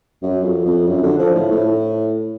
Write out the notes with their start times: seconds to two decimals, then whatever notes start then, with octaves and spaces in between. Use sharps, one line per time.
0.23 F#2
0.44 F2
0.65 F2
0.87 F#2
1.03 D3
1.19 F3
1.35 A2
1.51 A2